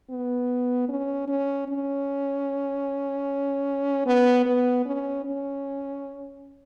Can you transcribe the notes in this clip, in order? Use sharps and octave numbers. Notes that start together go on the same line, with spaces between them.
B3
C#4
C#4
C#4
B3
B3
C#4
C#4